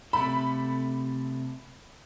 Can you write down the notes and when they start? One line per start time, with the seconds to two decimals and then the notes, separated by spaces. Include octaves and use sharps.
0.13 C3 A3 A4 B5